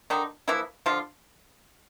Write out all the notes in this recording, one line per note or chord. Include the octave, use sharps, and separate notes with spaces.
D3 D#3 D#4
E3 F3 A#3 E4
D3 F3 F4